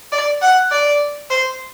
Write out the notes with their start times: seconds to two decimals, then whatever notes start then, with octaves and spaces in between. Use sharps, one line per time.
0.12 D5
0.42 F#5
0.71 D5
1.30 C5